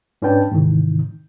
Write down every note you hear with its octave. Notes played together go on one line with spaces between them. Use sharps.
G#2 C#4 D4 B4 G5 A5
G#2 C3 D#3 E3